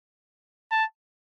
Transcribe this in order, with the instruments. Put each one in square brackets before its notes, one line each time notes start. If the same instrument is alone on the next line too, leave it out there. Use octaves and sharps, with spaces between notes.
[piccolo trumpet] A5